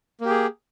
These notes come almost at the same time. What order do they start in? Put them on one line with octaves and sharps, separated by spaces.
A#3 G4 G#4